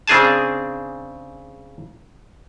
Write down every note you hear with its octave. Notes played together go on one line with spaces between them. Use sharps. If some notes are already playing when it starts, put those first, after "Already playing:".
C#3 C4 D4 G#4 G#5 A5